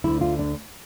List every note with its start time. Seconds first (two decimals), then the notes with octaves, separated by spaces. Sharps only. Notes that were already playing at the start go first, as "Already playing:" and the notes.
0.04 D2 D3 E4
0.21 F4
0.39 D4